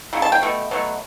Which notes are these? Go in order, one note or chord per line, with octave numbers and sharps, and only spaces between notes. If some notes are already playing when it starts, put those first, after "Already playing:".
C#3 F#3 A3
A5
G5
B2 A3
B2 F#3 A3